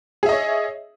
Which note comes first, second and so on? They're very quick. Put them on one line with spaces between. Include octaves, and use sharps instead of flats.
G#4 E5 D#5 C#5